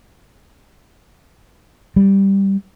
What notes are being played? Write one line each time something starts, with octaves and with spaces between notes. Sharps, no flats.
G3